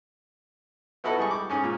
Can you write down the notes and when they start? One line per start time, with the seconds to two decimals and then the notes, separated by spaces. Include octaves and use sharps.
1.04 B3 E4 F#4 A4 B4 D#5
1.19 G3 G#4 C#6
1.31 D6
1.49 G#2 C#4 G#4
1.64 A#2